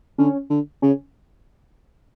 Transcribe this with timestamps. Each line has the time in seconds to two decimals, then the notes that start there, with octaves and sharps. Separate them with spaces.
0.18 D3 C#4
0.50 D3
0.82 C#3 C#4